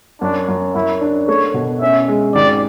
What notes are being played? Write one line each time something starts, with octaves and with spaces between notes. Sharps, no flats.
F#2 D4
F#2
F#2 E4
D4
A3 C#5
B2
C#4 E5
G#3
G#1 D5